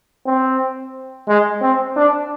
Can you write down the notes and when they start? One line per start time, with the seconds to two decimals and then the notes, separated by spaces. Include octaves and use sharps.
0.26 C4
1.28 G#3
1.61 C4
1.96 D4